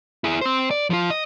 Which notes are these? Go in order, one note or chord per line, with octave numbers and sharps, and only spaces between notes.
E4 G#4
C4 C5
D5
F3 F4
D#5